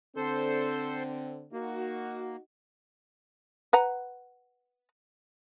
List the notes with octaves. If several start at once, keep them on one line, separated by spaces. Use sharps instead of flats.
D3 C4 A4 C5 C6
A#3 D#4 F#4
B4 F#5 A#5